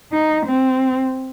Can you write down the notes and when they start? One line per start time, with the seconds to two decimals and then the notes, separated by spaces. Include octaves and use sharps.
0.12 D#4
0.47 C4